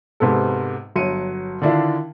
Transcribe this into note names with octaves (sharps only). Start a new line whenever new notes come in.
G#2 C3 B3 A4
G1 F#3 C#7 D#7
D3 D#3 D4 E4 F4